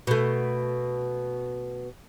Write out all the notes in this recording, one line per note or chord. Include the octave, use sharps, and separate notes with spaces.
B2 A3